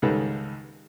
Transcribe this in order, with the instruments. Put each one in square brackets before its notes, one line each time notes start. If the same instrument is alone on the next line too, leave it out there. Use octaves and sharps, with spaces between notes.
[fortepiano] C#2 G#2 D#3 G3 A4 B4